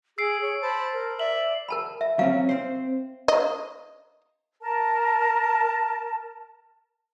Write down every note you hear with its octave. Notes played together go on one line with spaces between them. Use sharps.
G#4 E6 C7 D7
C#5
C5 A5 B5
A#4 C5
D5 E5 F#7
A#4 A5 B5
E5
F#3 C4 C#4 F5
C4 C5
D#5
A#4 A5